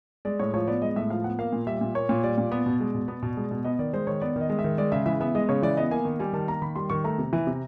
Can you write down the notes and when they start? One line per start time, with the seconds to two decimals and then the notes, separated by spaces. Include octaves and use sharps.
0.25 G#3 D5
0.39 A2 C#5
0.54 F3 C#5
0.68 B3 D5
0.82 G#3 D#5
0.96 A2 E5
1.10 F3 F5
1.24 B3 F#5
1.39 A#3 F5
1.53 A#2
1.67 G3 E5
1.81 A#2
1.95 A#3 C#5
2.09 A#2
2.23 G3 D5
2.38 A#2
2.52 B3
2.66 B2
2.80 G#3
2.95 B2
3.08 B3
3.23 B2
3.37 G#3
3.51 B2
3.64 B3 D#5
3.79 D#3 D5
3.93 G#3 C5
4.07 D#3 C#5
4.21 B3 D5
4.36 D#3
4.41 D#5
4.50 G#3
4.59 E5
4.64 D#3
4.78 G#3 D5
4.92 C#3 E5
5.06 E3 E5
5.21 B3 E5
5.35 G#3 D#5
5.49 C#3 C#5
5.62 E3 D5
5.77 B3 D#5
5.91 A#3 G#5
6.05 D#3
6.19 G3 G#5
6.33 D#3 A5
6.47 A#3 A#5
6.62 D#3 B5
6.76 G3 C6
6.90 D#3 C#6
7.04 A3 A#5
7.19 C3
7.33 E3
7.47 C3